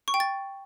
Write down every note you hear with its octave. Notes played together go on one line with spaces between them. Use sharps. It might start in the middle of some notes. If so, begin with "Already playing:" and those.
C#6
G5
A6